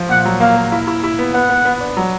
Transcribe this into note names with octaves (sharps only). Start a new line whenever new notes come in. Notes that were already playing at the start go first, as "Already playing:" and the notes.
Already playing: F3
A#2 F#5
F#3
A#3 F5
A#3
E4
E4
E4
B3
B3 F#5
B3
B3
D4
F#3